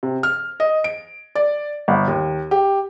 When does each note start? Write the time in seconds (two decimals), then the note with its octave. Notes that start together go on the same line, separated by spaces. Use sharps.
0.03 C3
0.23 F6
0.60 D#5
0.84 D7
1.35 D5
1.88 G1
2.08 D#2
2.51 G4